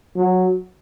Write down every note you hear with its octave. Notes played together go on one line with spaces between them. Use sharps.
F#3